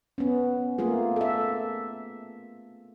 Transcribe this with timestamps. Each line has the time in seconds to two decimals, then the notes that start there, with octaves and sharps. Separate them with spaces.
0.18 B3 C#4
0.78 A3 A#3 F4 G#4
1.16 A4 E5